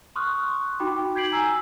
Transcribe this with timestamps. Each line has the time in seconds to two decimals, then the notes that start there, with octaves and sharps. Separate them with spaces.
0.16 C6 C#6 D#6 F6 F#6
0.80 D#4 F#4 G5 B5 D6
1.15 G6 G#6 B6 C7 D7 F#7
1.32 G#5 A#5 E6